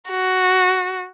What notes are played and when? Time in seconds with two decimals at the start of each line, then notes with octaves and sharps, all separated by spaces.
0.10 F#4